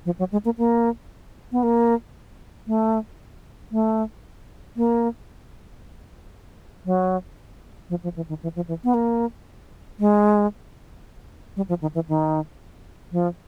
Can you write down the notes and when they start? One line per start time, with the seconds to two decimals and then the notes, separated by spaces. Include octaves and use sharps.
0.05 F3
0.19 F#3
0.32 G#3
0.45 A#3
0.58 A#3
1.52 B3
1.63 A#3
2.67 A3
3.72 A3
4.77 A#3
6.85 F#3
7.90 F3
8.04 F3
8.16 E3
8.29 D#3
8.43 E3
8.56 F3
8.68 E3
8.84 B3
8.94 A#3
9.99 G#3
11.56 G3
11.69 F3
11.81 D#3
11.95 E3
12.09 D#3
13.12 F3